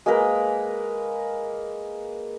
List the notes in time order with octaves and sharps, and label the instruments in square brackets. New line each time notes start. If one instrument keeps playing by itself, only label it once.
[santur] G#3 A#3 A#4 B4